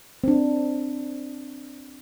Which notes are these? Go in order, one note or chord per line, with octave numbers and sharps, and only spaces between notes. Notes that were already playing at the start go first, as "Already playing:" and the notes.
C4 D4